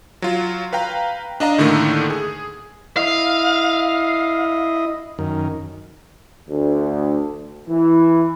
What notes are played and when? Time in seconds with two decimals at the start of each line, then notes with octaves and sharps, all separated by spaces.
0.22 F#3 F4
0.73 B4 F5 G5 A#5
1.40 D4 D#5 F5 A#5
1.58 A2 D3 D#3 A3 A#3
2.10 G#4
2.97 E4 D#5 F5
5.19 F#2 D#3
6.49 D2
7.69 E3